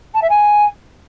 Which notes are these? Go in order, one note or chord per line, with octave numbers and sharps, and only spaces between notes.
A5
E5
G#5